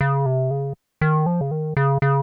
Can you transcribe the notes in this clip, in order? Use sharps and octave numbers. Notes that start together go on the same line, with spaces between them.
C#3
C3
C#3
D#3
F3
C#3
D#3
C#3
C#3